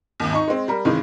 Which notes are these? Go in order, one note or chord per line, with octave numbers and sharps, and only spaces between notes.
G#1 D#2
D#4 C#6
G#3 C4
G3 A#4
G2 C3 D#3 E3 G#3